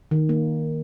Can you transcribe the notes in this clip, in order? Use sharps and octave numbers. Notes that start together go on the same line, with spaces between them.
D#3
A#3